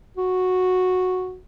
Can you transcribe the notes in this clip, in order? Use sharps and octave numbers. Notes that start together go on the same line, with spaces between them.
F#4